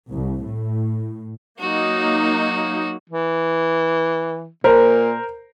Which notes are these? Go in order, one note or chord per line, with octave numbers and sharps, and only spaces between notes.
C2
A2
F#3 A#3 D#4 F#4
E3
A#2 A#4 C5